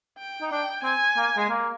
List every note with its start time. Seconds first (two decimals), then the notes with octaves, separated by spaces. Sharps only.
0.18 G5
0.41 D#4
0.52 D4 G5
0.83 C4 G#5
1.17 A#3
1.37 G#3
1.49 A#3